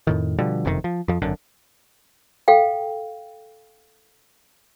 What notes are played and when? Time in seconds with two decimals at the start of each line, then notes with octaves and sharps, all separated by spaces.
0.07 F2 A2 D#3
0.39 B2 D3 F3 G3
0.65 F#1 F2 C3 D#3
0.84 F3
1.08 F2 F3
1.22 G#1 F#2 D3
2.48 A4 F5 G5